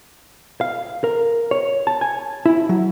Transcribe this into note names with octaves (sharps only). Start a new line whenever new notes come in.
F5
A#4
C#5
A5
G#5
E4
F#3